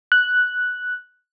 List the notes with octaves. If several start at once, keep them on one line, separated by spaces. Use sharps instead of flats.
F#6